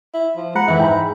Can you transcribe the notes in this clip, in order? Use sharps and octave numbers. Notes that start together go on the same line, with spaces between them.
E4
F3
G#3 F#5 A#5 B5
F2 E3 E4
G#2 G5 A#5 B5